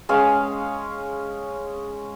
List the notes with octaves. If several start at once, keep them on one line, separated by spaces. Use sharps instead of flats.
G#3 C#4 F5